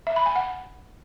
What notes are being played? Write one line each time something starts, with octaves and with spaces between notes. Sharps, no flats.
E5
B5
G#5
F#5